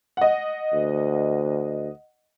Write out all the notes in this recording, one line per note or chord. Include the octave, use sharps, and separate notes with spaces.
D#5 F#5
D2